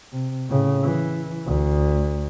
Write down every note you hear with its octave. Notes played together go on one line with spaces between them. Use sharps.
C3
A2 C#3
E3
D2